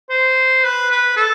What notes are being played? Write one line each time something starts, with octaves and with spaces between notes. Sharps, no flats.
C5
B4
B4
A4